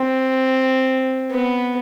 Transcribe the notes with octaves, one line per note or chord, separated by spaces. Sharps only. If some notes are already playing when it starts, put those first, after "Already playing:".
Already playing: C4
B3